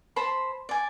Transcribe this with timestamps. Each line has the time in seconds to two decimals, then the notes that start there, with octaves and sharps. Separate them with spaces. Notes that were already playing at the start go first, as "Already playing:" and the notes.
0.16 C5 A5 B5 C6
0.69 D5 G#5